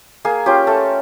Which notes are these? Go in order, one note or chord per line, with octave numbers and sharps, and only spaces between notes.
A#3 G#4
C#4 F4 G4
A3 A4